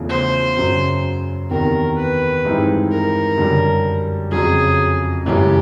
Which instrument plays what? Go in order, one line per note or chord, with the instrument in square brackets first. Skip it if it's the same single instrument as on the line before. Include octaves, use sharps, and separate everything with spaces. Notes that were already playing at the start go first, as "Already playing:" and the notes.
Already playing: [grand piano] E2 C#3 F3 A3 D4
[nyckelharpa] C5
[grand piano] F#2 C#3 F#3
[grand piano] E2 C3 D#3 [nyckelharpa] A#4
[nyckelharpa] B4
[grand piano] G2 E3 G#3 C4 D#4
[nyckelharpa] A#4
[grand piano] F#2 D3 G3
[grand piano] F2 C#3 F#3 [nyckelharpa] G#4
[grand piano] F#2 C#3 E3 G#3 [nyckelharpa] G4